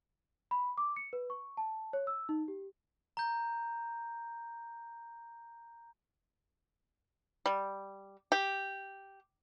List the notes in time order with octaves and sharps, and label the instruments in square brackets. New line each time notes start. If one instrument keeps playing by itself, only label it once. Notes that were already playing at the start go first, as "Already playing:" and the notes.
[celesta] B5
D6
C#7
B4
C#6
A5
C#5
E6
D#4
G4
[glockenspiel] A#5 G6
[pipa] G3
G4